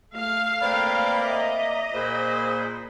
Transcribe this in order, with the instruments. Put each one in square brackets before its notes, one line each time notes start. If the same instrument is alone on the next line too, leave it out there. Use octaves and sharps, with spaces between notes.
[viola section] A3 F5
[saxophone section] A#3 C4 D5 [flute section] B4 G5 B5
[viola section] D#5 [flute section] E5 A#5 D6
[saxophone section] A#2 C5 [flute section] G#4 B5